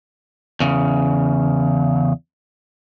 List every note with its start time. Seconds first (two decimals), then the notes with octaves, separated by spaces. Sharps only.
0.60 E2 C#3